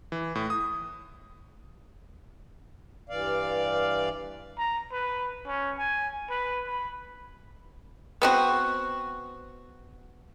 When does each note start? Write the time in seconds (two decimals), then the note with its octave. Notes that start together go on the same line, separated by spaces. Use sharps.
0.12 E3
0.35 A2
0.50 D#6
3.10 G2 E3 D5 F5
4.58 A#5
4.92 B4
5.47 C#4
5.78 G#5
6.30 B4
6.67 B5
8.22 B3 C4 F#4